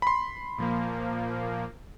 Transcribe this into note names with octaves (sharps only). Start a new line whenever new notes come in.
B5 C6
A#2 F3 A#3